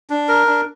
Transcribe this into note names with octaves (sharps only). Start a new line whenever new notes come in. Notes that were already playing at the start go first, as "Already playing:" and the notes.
D4
A#4
D4